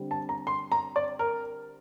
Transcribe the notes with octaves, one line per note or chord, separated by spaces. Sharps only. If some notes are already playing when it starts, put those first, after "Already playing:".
Already playing: D3 G3 C4
A5
A#5
C6
A#5
D5
A#4